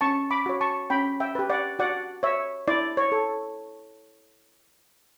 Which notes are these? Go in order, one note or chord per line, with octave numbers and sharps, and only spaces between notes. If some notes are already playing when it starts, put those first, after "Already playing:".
C#4 A5 C#6
B5 D6
F#4 C#5
A5 C#6
C#4 G5 B5
E5 G5
G4 B4
D5 F#5
F#4 D5 F#5
C#5 E5
E4 D5
C#5
A4